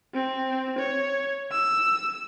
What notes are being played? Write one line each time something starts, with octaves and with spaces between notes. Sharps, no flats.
C4
C#5
E6